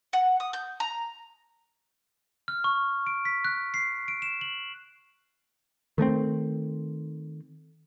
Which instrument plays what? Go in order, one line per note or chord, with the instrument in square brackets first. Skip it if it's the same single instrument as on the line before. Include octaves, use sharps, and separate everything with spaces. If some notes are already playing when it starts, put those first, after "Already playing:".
[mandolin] F#5
D#6
G6
A#5
[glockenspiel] F6
C#6
D7
B6
F#6
C7
D7
E7
F#7
[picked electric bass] D#3 A3 A#3 C4